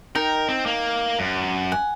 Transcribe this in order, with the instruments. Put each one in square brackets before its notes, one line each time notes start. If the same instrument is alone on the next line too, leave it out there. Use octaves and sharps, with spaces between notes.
[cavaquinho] D#4 G5 [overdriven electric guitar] A#4
[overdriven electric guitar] C4
A#3
F#2
[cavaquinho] F#5 G#5